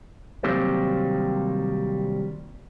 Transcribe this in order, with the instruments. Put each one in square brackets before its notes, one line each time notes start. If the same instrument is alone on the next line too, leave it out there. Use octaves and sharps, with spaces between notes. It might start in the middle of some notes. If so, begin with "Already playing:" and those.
[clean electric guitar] C3 D#3 F#3 G3 A#3 C4